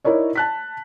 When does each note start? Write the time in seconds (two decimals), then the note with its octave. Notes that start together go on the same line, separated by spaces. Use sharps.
0.04 D#4 E4 A#4 C#5 D5
0.36 A5 F#6 B6